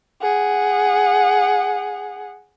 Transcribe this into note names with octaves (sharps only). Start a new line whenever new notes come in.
G#4 F#5